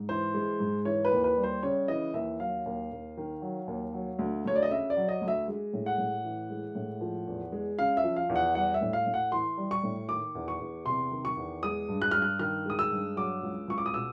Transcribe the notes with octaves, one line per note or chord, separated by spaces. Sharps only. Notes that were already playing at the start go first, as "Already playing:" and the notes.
Already playing: G#2
E3 C5
G#3
G#2
E3 C#5
B4
D#2
B4
G3
C5
C#3 C#5
E3 D#5
D#2 E5
F#3 F5
D#2
D#2
D#3
F#3
D#2
F#3
D2
D2 C#5
D5
D#5
C#3 E5
D5
F#3
D#5
D2
E5
G#3
A2
F#5
A2
E3
G#3
A2
F3
E2
G#3
C#3 F5
E5
F3
F5
E2
F#5
G3 F#5
E5
A2
F5
A2
F#5
E3 C6
G3
C#6
A2
D#3 D6
E2
C#6
E2
C3 C6
D#3
C#6
E2
G#3 D#6
G2
F#6
G2 F6
F#6
D#3 F6
G#3 D#6
E6
G2
F#3 D6
C#2
C#2 C#6
D6
D#6
B2 E6